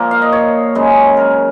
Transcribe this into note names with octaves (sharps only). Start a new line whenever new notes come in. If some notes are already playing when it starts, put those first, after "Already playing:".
Already playing: A#2 F3 A#3
F5
D#5
C#5
F#2 C#3 G#3
A#4